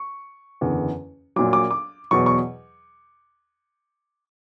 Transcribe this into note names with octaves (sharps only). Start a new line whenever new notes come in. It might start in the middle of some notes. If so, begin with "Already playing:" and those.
Already playing: C#6
F#1 E2 D3
A#1 A#2 F#3 D6
D6
D6
E2 B2 F#3 C#6
C#6